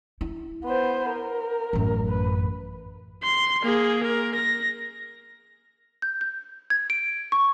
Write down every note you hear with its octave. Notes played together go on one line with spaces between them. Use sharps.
E4
B3 C5
A#4
A1 F#2
B4
C6
A#3 G#4
A#4
A#6
G6
G6
G#6
D7
C#6